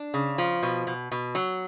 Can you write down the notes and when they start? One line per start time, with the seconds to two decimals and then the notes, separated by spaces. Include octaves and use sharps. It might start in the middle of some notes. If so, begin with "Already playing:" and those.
Already playing: D4
0.14 C#3
0.38 F3
0.63 B2
0.87 B2
1.12 B2
1.35 F#3